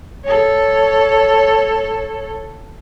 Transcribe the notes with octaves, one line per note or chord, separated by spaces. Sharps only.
A4 C#5